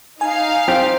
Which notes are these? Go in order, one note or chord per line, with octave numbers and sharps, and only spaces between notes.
D#4 F5 G#5
C4 G4